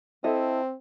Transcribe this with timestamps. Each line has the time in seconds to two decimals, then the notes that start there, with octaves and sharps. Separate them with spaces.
0.24 C4 E4 A4 D#5